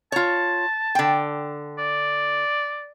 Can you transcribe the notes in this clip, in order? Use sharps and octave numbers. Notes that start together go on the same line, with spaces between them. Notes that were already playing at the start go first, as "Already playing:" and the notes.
F4 C#5 A5
D3 G5
D5